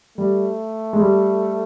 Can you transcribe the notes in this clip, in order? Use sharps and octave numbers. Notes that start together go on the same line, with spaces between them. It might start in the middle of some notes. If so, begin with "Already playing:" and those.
G3 A3
G#3
G3